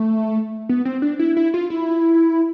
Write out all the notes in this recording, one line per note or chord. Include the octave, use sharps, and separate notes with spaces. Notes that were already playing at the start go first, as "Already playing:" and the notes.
Already playing: A3
B3
C4
D4
E4
E4
F4
E4